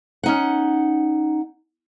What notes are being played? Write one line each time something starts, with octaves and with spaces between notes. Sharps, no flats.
C#4 D#4 F#5